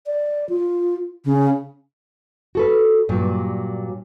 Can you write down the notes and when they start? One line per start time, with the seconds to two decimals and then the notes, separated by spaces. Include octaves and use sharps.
0.06 D5
0.49 F4
1.25 C#3
2.55 F#4 A4 B4
3.09 G2 A#2 F#3